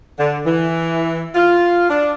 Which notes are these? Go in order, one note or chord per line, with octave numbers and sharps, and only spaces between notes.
D3
E3
F4
D4